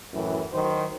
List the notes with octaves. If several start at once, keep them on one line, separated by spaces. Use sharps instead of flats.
F#2 A2 E3
D#3 F#3 C5